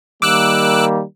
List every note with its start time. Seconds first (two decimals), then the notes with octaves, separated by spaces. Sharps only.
0.22 D#3 G3 A#3 D6 E6 F#6